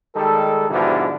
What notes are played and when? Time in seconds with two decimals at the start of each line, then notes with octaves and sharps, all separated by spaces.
0.15 D#3 G3 G#3 A4
0.70 G#2 B2 D3 E3 F3 G3